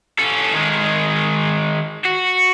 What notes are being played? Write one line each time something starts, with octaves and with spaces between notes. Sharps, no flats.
C#4 A4
D#3 G#3
F#4